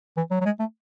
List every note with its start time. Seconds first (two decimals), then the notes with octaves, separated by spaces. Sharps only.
0.17 E3
0.31 F#3
0.41 F#3
0.45 G#3
0.59 A3